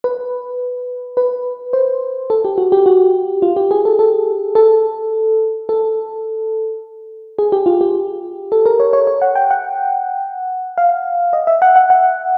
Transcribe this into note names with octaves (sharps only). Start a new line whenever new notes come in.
B4
B4
C5
A4
G4
F#4
G4
F#4
F4
G4
G#4
A4
A4
A4
A4
G#4
G4
F4
G4
A4
A#4
C#5
C#5
C#5
F#5
G5
F#5
F5
D#5
E5
F#5
F#5
F#5